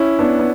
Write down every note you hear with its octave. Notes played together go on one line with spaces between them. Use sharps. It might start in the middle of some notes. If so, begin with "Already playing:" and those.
Already playing: C#4 E4
B3 D4
B3